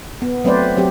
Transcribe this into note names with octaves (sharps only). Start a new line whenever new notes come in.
B3
F#3 A3 C4 B4 C5 D5
F#3 C4 G4